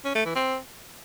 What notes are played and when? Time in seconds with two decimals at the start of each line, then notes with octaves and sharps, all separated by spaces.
0.05 C#4
0.15 A3
0.25 E3
0.35 C4